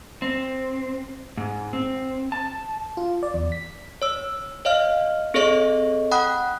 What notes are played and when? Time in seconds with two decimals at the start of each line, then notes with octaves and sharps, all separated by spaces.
0.22 C4
1.37 G#2
1.73 C4
2.32 A5
2.97 F4
3.23 D5
3.34 E2
3.52 B6
4.02 C#5 E6
4.65 C#5 D#5 F5 F6
5.34 C4 G#4 A4 C#5 D#5 C#6
6.11 F#5 G5 B5 D#6 F#6